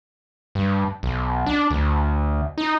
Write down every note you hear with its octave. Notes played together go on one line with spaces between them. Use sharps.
G2
B1
D4
D2
D#4